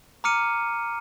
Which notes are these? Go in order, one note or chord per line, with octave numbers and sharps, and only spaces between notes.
A#5 D6 F6 C#7 D#7